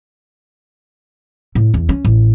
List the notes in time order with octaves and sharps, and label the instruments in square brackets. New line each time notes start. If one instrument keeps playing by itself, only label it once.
[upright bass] A2
E2
C#4
A1